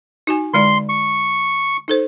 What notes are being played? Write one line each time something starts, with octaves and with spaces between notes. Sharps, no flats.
D#4 F#4 G#5
D3 G#3 D5 C6
C#6
D#4 A4 C5